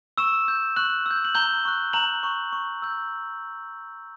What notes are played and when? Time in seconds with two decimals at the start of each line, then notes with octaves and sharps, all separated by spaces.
0.18 C#6 E6 E7
0.48 E6 G6
0.76 C#6 F#6 F#7
1.06 E6 G6
1.25 F#7
1.35 A#5 G6 G7
1.65 C#6 F#6
1.93 A#5 F#6 F#7
2.23 C#6 F#6
2.52 C#6
2.82 E6 G6